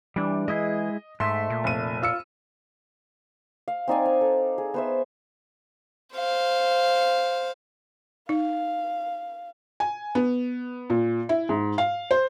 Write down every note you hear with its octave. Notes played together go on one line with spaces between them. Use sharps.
E3 G3 D4
G#3 E4 G#4 D#5
G#2 A3 E5 C6
A#2
F1 D#7
F4 E6 C#7
F5
C4 D#4 D5 G#5
G#5
A4
G#4
B3 C5 E5
C5 F5
D#4 F5
G#5
B3
A#2
E4
G#2
F5
C5